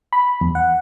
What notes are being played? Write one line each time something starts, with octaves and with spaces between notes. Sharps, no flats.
B5
E2
F#5